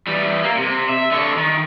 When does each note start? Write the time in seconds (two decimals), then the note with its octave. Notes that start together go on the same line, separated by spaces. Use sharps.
0.07 E3 G3
0.43 A#3
0.57 C3
0.89 E5
1.11 D3 C#5
1.36 D#3